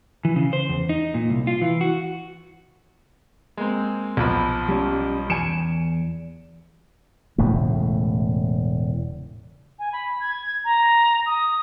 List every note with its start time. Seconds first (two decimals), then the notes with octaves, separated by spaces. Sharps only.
0.25 E3
0.36 C#3
0.53 C5
0.69 E2
0.89 D#4
1.14 A#2
1.30 C2
1.47 F4
1.61 E3
1.81 F#4
3.57 G#3 A#3 C4
4.17 B1 F3 B5
4.69 G3 C#4
5.30 E2 G#5 C#7 D7 E7
7.38 E1 A2 C#3 A3
9.79 G#5
9.93 B5
10.20 G#6
10.65 A#5
11.26 D#6